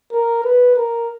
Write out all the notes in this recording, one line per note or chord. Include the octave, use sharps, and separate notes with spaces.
A#4
B4
A#4